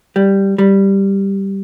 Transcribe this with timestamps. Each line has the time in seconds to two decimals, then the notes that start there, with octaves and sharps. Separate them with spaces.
0.16 G3
0.58 G3